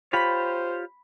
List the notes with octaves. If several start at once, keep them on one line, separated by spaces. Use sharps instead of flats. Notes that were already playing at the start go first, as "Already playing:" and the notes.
F4 G4 C5 C#5 B5 B6